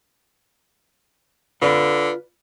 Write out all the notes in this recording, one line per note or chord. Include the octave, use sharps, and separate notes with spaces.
D3 F4 B4 D5